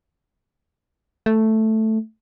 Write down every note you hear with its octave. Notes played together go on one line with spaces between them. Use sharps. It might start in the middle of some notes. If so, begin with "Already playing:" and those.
A3